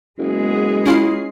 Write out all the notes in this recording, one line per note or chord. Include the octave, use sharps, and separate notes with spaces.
F#1 G#3 B3 G#4
C#4 E4 F4 C7